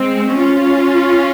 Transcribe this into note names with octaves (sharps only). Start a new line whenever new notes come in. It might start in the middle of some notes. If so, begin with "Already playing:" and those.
Already playing: G#3 C4
C#4 F4